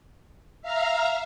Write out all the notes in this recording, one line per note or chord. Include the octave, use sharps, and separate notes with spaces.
E5 F5 A#5 F6